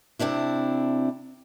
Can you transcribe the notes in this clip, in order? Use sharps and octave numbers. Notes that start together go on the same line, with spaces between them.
C3 C4 D4 E4